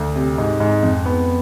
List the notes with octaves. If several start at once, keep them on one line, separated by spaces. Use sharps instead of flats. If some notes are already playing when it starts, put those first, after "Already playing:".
Already playing: D2
C3
G#2
G#2
F2
B3